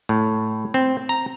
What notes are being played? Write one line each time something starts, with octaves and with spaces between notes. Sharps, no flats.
A2
C4
A#5